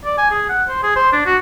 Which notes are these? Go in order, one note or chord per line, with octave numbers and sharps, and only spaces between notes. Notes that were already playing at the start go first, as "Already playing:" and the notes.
D5
G#5
G#4
F#5
C5
G#4
C5
D4
F#4